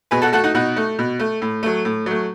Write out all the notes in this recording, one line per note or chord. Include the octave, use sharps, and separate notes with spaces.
B2 G#4 B4
F#4 A4
A3 F#4 A4
D#4 F#4
B2 D#4 F#4
A3
B2
A3
A2
F#3 A3
A2
F#3 A3